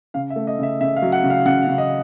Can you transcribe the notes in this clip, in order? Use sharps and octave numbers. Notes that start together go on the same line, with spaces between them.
C#3 F5
E5
A3
D#5
C#3 E5
C#3 E5
F5
F#3
F#5
C#3
F5
C#3 F#5
F5
C#3
D#5